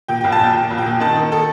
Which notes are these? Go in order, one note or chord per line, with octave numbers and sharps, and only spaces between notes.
A#2 G5
G5
A#1
A5
A#1 G5
A#2
A#1
G5
A#2
D#3 A5
D#3
A4